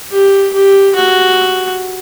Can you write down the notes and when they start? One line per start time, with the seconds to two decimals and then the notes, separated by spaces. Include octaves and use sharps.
0.12 G4
0.54 G4
0.95 F#4